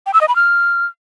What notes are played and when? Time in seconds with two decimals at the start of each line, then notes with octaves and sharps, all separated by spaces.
0.06 G5
0.14 E6
0.21 D#5
0.28 B5
0.36 F6